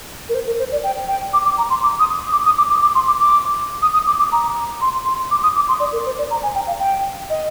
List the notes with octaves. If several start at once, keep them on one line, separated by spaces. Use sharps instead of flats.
A#4
C5
A#4
C5
D5
G5
G5
D6
D6
A#5
C6
D6
D#6
D6
D#6
D6
D6
D6
C6
D6
D6
D#6
D#6
D6
D6
A#5
C6
C6
D6
D#6
D6
C6
D5
A#4
C5
D5
A#5
G#5
G5
F5
G5
D#5